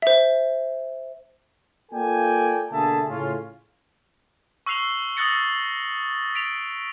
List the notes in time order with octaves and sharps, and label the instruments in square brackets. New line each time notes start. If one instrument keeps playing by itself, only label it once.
[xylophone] C5 E5
[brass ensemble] A#3 F4 A4 D5 G5 G#5
B2 D3 A#3 G#4 E5 A5
A2 C#3 A3 C#4 F4
[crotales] C#6 E6 F#6 C7 F7 G7
D#6 E6 F#6 A6 A#6 C#7
B6 D7 F7